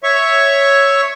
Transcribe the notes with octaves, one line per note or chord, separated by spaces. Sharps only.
C#5 E5 C#6